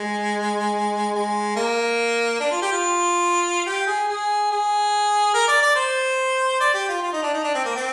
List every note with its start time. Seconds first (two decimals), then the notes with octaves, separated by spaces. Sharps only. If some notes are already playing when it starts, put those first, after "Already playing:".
Already playing: G#3
1.14 G#3
1.56 A#3
2.40 D4
2.51 F4
2.62 G4
2.72 F4
3.66 G4
3.87 G#4
4.08 G#4
4.51 G#4
5.34 A#4
5.48 D5
5.62 D5
5.75 C5
6.60 D5
6.74 G4
6.88 F4
7.02 F4
7.13 D#4
7.22 D4
7.33 D#4
7.44 D4
7.55 C4
7.65 A#3
7.75 C4